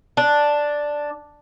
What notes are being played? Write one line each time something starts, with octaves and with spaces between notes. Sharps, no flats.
D4